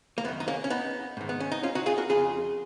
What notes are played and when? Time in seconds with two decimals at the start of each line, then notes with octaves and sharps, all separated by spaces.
0.18 A#3
0.24 F#2 B3
0.28 D#3
0.40 D#4
0.48 A#3 C#4
0.64 C#4
0.70 B3 D#4
1.17 G#2 D#3
1.29 B3
1.40 C#4
1.52 D#4
1.63 C#4 F4
1.75 D#4 F#4
1.86 F4 G#4
1.98 F#4 A#4
2.09 F2 C#3 F4 G#4